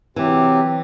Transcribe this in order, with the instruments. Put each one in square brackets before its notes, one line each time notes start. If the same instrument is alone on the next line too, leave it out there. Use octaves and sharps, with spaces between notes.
[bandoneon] C3 F#3 C4 G4 [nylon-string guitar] E3